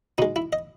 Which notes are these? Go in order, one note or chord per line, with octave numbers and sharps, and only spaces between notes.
B2 G#3 D#4
E4
D#5